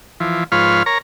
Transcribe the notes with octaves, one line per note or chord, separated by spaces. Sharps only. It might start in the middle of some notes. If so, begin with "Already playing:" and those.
E3 F3
G#2 F3 F4 B4 C#5 F6
A#4 C#5 A#5